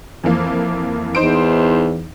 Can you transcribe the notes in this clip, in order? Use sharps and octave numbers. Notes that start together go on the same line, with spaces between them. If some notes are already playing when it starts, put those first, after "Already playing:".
F2 E3 A#3
E2 D#4 C5 D7